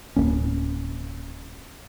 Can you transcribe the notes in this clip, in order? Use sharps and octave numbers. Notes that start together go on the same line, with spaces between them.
D1 A#2 A#3 C#4